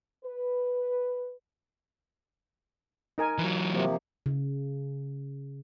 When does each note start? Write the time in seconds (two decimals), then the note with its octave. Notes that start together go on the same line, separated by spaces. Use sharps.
0.25 B4
3.18 D#4 A#4 G#5
3.38 E3 F#3
3.72 C3 F3 A#3
4.26 C#3